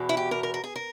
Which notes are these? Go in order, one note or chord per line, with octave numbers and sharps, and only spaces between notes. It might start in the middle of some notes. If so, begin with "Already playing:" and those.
Already playing: E2 B2
E4
G4
A#4
A#4
A#4
G#4
A#4